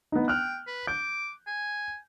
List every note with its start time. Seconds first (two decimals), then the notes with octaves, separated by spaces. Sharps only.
0.12 B3 D#4
0.28 G5 F6 F#6
0.67 B4
0.87 D6 G6
1.47 G#5